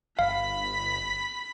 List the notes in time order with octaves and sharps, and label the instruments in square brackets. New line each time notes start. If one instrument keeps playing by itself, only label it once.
[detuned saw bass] G1 [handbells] F5 [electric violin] B5 B6